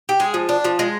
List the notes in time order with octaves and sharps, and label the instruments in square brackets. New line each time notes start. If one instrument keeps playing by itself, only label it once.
[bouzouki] G4
G#3 G#4
F3
D4
F3
G#3